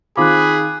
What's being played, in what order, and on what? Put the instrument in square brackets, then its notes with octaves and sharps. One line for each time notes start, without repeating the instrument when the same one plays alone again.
[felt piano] D#3 C4 F4 [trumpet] G#4 [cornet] B5 [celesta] D6 F#6